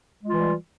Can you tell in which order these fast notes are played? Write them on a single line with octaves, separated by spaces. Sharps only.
G#3 F4 E3 G3